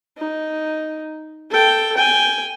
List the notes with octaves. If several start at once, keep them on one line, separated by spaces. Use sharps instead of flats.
D#4
A4 G5
G5 G#5